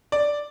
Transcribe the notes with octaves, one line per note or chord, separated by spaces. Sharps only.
D5